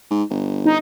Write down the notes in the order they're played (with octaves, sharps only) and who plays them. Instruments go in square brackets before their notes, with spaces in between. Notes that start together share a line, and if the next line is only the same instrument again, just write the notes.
[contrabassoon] G#2
G1
[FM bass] D#4